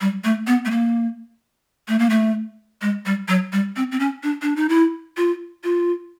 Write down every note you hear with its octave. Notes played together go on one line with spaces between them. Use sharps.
G3
A3
B3
A3
A#3
A3
A#3
A3
G#3
G3
F#3
G3
C4
C4
C#4
D4
D4
D#4
E4
F4
F4